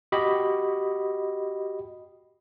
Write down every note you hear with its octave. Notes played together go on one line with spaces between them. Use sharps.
F#4 G4 D#5 B5